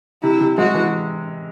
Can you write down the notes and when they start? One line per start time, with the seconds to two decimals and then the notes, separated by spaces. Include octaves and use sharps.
0.23 C3 E4
0.41 C3
0.58 G#3 F#4
0.75 E3